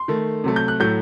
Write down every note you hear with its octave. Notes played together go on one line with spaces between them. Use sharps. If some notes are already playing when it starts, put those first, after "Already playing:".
Already playing: C6
D#3 A3
C3 F#3 A3
G6
F#6
A2 F#3 A3 G6